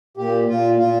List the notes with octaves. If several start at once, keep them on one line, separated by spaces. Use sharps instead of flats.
A#2 G4
A#2 F4
A#2 F4